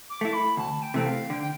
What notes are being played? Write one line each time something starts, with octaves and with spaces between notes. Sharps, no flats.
D6
A3 E4
B5
D2 A5
G5
C3 E3 A3 C4
F5
D3 G5
G5